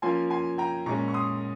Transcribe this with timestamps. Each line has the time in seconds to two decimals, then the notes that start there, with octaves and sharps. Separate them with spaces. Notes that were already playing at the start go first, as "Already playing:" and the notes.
0.02 F3 A#3 C#4 F4 G#5 C6
0.30 G#5 C6
0.58 G5 A#5
0.86 A#2 G#3 C#4 A#5 C#6
1.08 C#6
1.14 C6 D#6